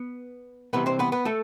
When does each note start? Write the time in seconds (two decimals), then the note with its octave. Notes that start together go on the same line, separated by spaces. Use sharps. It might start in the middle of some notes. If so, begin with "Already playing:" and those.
Already playing: B3 B4
0.73 C2 C3 E3 B3 B4
0.86 C4 C5
0.99 B3 B4
1.12 B3 B4
1.25 A3 A4